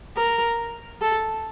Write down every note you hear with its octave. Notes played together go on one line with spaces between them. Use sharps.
A#4
A4